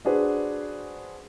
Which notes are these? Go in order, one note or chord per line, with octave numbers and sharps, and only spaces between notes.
D4 F#4 G#4 B4 C5